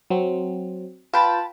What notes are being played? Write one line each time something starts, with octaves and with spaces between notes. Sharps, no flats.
F#3 C4
F4 B4 G5 A5 B5